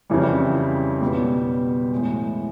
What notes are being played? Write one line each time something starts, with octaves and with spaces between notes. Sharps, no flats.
F2 C#3 E3 G3
B1 B2 G3 B3
A2 E3 G#3